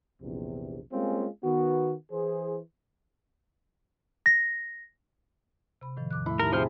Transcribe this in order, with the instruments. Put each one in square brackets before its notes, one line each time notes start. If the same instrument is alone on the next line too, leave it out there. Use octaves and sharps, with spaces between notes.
[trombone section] A#1 E2 C3
G3 G#3 A#3 C4 C#4 F4
D#3 B3 F#4
E3 G#4 C5
[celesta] A#6
[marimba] C3 B5
A2 D#3 F3
E2 D6 F#6
[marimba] A2 A3 [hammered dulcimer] E4
[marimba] D#4 G4 A5 [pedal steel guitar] A#4
[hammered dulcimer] C3 G#4 [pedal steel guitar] F3 C5 F6